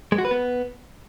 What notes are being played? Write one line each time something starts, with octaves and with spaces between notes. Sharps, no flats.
G#3
F#4
B4
B3